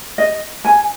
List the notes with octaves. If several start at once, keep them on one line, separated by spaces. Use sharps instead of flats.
D#5
G#5